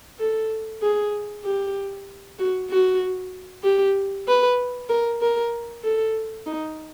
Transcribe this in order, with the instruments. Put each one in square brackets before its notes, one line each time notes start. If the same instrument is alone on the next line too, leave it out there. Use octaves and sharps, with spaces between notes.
[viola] A4
G#4
G4
F#4
F#4
G4
B4
A#4
A#4
A4
D#4